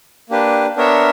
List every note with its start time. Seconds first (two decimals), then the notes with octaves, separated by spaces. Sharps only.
0.30 A#3 D4 G4 B4
0.76 B3 D4 A#4 C#5 E5